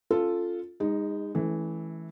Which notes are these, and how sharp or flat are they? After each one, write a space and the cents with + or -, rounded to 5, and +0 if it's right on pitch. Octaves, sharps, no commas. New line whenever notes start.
C#4 +0 F4 +0 A4 +0
G#3 -35 D#4 +0
E3 -10 A3 -35 C#4 +0